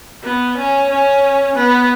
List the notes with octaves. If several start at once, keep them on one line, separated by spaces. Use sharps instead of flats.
B3
C#4
C#4
B3